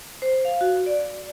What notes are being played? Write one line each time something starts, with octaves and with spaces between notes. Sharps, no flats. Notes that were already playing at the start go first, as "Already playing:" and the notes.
C5
F5
F#4
D5